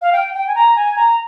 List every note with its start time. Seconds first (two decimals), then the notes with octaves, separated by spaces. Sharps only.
0.02 F5
0.13 G5
0.34 G5
0.47 G#5
0.55 A#5
0.76 G#5
0.96 A#5